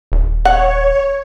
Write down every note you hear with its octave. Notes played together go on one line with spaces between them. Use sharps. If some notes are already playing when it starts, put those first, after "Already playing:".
D#1
C#5 F#5